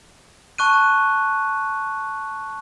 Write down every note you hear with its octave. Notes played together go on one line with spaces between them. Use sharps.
A5 C#6 F#6 D#7